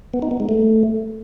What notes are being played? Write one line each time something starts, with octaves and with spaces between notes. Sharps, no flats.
B3
D#4
B3
G#3
A3